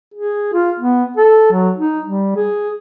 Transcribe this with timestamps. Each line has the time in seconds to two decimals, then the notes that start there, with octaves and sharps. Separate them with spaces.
0.14 G#4
0.54 F4
0.80 B3
1.17 A4
1.52 F#3
1.78 D#4
2.06 G3
2.36 G#4